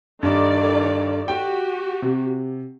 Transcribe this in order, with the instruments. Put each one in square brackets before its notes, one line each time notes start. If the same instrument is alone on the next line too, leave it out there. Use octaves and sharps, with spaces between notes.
[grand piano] G2 [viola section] D#3 A4 D5
[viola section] F#4 G4 [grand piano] G5
[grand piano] C3